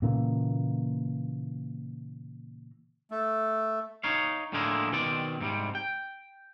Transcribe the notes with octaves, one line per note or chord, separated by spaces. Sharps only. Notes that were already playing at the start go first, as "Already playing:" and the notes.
A#2 C#3 E3 A#3
A3
D#4 C#5 F5
A2 D3 F3 G#3 A#3 E4
B2 D#3 C4 D5
G#2 C3 G3
G5